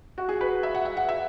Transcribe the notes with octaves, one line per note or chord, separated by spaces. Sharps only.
F#4
G#4
B4
E5
F#5
E5
F#5
E5